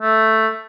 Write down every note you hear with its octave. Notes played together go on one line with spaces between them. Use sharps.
A3